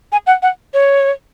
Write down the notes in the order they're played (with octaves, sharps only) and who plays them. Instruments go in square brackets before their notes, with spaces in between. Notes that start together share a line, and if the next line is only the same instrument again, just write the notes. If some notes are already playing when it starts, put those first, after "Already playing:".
[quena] G#5
F#5
F#5
C#5